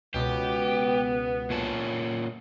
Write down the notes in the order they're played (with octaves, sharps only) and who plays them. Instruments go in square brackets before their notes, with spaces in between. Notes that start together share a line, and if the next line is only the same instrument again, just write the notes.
[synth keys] C#2 B2 [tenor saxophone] B3 [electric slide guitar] G4
[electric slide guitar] A#2 C#4 A5